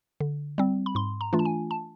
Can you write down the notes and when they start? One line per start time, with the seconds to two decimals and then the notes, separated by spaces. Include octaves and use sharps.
0.20 D3
0.58 G3 C4
0.86 B5
0.95 G#2 C6
1.21 A#5
1.33 E3 A3 D4 F4
1.39 A5
1.45 G#5
1.71 A5